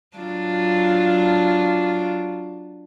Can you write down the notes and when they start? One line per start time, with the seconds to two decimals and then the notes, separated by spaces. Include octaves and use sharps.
0.17 F#3 D4 F4